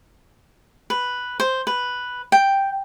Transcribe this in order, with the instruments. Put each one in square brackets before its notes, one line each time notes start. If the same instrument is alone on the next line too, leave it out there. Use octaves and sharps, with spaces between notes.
[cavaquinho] B4
C5
B4
G5